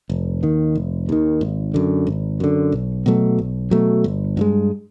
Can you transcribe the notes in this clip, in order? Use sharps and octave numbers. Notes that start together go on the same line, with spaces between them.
F1
D#2 D#3
F1
D#2 D#3
G#1
F#2 D3
G#1
F#2 D3
B1
B2 F#3 A3
B1
B2 F#3 A3
G1
G2 E3 G#3